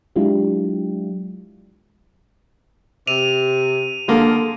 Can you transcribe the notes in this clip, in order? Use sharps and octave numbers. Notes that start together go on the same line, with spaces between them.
F#3 G#3 D4 E4 F4 G4
C3 D#7 F7
D3 A3 A#3 F4 G#4